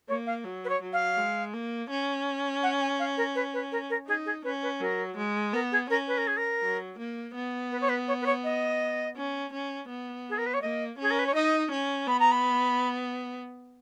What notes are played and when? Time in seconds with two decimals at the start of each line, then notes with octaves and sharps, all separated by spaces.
0.08 A#3 C#5
0.26 F5
0.44 F#3
0.65 B4
0.69 C#5
0.81 F#3
0.93 F5
1.17 G#3
1.53 A#3
1.90 C#4
2.63 F#5
2.81 G#5
2.99 F5
3.17 A#4
3.35 B4
3.53 B4
3.72 A#4
3.90 A#4
4.07 D#4 G#4
4.26 G#4
4.44 C#4 B4
4.62 B4
4.81 F#3 A#4
5.17 G#3
5.53 B3 A#4
5.72 G#4
5.90 C#4 A#4
6.08 B4
6.17 A#4
6.27 G#4
6.37 A#4
6.62 F#3
6.99 A#3
7.35 B3
7.71 B4
7.81 C#5
7.89 B4
8.08 C#5
8.21 B4
8.26 C#5
8.44 D#5
9.16 C#4
9.53 C#4
9.89 B3
10.30 G#4
10.38 A#4
10.46 B4
10.54 C#5
10.62 A#3 D#5
10.98 C#4 G#4
11.11 A#4
11.19 B4
11.26 C#5
11.34 D#4 D#5
11.71 C#4
12.07 B3 B5
12.20 A#5
12.31 B5